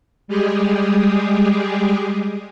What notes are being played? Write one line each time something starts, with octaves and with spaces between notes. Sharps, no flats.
G3 G#3 G4 G#4